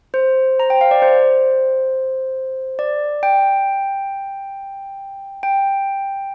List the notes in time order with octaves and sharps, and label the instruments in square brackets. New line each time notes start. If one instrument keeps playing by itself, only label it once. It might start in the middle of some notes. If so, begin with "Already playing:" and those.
[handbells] C5
A#5
G5
F5
D5
C5
D5
G5
G5